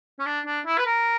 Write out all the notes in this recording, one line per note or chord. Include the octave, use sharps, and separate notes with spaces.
C#4
D4
D4
E4
B4
A#4